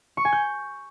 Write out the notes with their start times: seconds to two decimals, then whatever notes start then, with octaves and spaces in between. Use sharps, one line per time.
0.17 C#6
0.25 G#5
0.33 G6